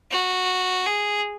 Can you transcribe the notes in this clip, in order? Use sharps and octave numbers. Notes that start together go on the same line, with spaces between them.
F#4
G#4